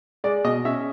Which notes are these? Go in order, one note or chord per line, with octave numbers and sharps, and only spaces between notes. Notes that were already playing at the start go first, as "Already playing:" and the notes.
G#3 D5
B2 D#5
C#4 E5